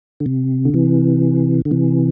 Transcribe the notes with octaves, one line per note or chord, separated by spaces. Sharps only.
D3
C3
D3
C3 E3
D3
C3 E3